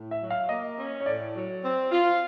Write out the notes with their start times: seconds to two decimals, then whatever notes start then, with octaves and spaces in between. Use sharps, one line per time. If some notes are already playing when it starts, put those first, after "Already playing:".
Already playing: A2
0.11 E5
0.21 F#3
0.30 F5
0.49 A#3 D#5
0.78 C#4
1.01 C#5
1.06 A2 D5
1.35 F#3
1.63 C4
1.91 F4